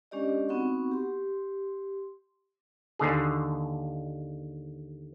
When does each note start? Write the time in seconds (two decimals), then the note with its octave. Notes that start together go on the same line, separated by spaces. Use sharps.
0.11 G#3 C#4 D4 G4 D5 D#5
0.49 B3 C4 D#4 F#4 F#5 C#6
0.91 G4 C6
2.99 D#2 D3 G#4